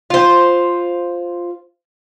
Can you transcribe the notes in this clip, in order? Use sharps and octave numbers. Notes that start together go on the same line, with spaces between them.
F4 C5